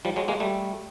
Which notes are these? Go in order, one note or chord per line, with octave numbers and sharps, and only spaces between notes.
F3 G3
F#3 G#3
G#3 A#3
G3 A3